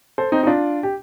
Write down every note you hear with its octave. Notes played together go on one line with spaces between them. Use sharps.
A4 C5
C4 D#4
D#4
D4 F4
G4